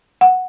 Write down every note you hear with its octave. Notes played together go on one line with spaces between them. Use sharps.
F#5